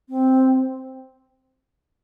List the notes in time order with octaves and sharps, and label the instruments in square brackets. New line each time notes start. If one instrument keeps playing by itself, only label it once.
[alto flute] C4